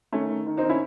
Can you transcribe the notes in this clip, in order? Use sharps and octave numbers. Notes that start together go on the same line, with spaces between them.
D#3 A3 C#4
D#3
D#3
C4 D#4
D#3
C#4 E4